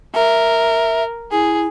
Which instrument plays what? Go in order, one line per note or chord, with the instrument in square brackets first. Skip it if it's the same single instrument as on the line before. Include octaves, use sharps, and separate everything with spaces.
[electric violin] A#4 [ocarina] E5
[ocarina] E4 [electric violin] G#4